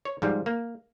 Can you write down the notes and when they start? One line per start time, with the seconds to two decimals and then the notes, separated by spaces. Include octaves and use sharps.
0.05 C#5
0.22 G#2 F3 G3
0.46 A#3